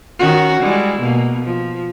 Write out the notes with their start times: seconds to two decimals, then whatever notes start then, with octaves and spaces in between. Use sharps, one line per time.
0.19 D#3 C#4 F#4
0.60 G3 G#3 E4
1.00 B2 A#3
1.43 F3